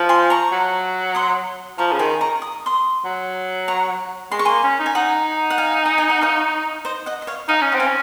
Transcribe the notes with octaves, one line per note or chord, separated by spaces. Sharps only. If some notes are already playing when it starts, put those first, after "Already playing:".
Already playing: F3
G#5 C6
A#5 C#6
F#3
C6 D#6
F3 A#5 C#6
C#3
D#3 G#5 C6
A#5 C#6
D#6
C6 D#6
F#3
A#5 C#6
G#3 C6
C#6
A#3 G#5 C6
C#4
D#4
G#5
D#4 F#5 A#5
F#5
F5 G#5
A#5
G#5
F#5
C#5 F5
C5 D#5
D#5 F#5
D#5
C#5 F5
D#4 F5 G#5
C#4
C4 F#5
F5 G#5
C#4